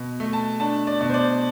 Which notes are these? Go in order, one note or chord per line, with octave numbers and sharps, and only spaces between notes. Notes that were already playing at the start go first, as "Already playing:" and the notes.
Already playing: B2
A3
A5
D4 A5
D5
B2
C5
D5